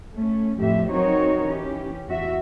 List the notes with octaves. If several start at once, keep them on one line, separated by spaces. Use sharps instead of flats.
A3 C#4
F2 A2 F3 G4 E5
F#3 C4 D#4 F#4 A#4 C#5
E3 C#4 G4
E2 F#4 E5